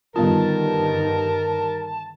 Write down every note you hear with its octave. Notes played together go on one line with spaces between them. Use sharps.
G2 D3 D#3 G3 B3 F4 A#4 A5